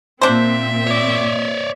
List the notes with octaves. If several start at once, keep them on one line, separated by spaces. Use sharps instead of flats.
A#2 C4 D4 C5 E5
C#5 D5